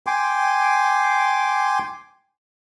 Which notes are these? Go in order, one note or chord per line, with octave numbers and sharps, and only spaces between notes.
G5 G#5 C6 D6